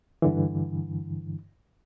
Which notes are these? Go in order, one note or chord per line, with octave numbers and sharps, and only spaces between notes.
G2 D3 E3